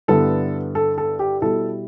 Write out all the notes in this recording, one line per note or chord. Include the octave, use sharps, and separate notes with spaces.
G2 D3 B3 E4 A4
A4
A4
G4
B2 G3 E4 A4